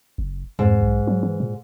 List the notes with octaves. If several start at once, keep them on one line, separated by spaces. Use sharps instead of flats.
F#1
F2 G#2
B1
F#3
E3
A#2